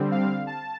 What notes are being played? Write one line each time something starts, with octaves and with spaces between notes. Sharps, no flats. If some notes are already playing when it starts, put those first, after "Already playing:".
Already playing: D3 G3 C4
F5
A5